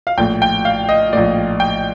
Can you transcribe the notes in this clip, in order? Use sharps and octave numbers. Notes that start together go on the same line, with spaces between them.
F5
A#1 A2 G5
G5
F5
D#5
A#1 A2 D5
G5